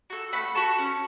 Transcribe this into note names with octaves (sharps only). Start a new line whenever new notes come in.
F#4 A4
A3 F#5 B5
F#4 A4 A5 C#6
C#4